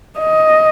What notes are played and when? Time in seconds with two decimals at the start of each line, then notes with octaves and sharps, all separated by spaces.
0.20 D#5